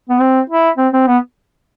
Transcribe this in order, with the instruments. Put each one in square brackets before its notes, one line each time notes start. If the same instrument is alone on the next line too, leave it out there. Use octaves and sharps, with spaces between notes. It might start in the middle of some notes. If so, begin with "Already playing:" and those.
[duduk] B3
C4
E4
C4
C4
B3